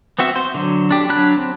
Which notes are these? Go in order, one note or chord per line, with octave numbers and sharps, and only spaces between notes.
B3 C4 F#4 E5
C5
D3 F#3
D4 G4
F#3 D4 B5 F#6
C4